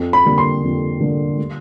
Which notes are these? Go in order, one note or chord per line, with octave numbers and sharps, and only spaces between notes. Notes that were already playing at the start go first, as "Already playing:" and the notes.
Already playing: F2
B5
D3 G3 A#3
C6
F2
D3 G3 A#3
G3